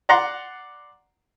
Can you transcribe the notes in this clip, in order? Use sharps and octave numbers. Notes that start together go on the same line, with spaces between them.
D5 F#5 A#5 C6